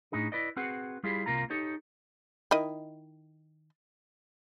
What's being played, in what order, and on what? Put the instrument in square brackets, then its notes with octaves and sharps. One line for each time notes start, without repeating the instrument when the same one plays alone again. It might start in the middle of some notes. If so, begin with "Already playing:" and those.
[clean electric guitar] A2 D4 D#4 G#4
E4 B4 D5 D#5
C4 F#4 G#4 B4 F#5
G3 E4 F4 G4 G#4
C2 C3 A#3 F4 A#5
D#4 G4 A4 C#5
[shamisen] D#3 E4 D#5